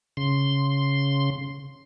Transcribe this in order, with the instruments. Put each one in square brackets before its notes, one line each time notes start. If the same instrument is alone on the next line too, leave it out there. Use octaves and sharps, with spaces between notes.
[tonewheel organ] C#3 C6